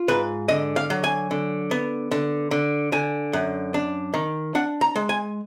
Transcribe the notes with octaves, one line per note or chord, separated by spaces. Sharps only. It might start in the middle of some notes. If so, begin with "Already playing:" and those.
Already playing: F4
G#2 B4
D3 D#5
F5
F#3
G#5
D3
B3
D3
D3
D3 G#5
F#2
D4
D#3
D4 F#5
A#5
G#3
G#5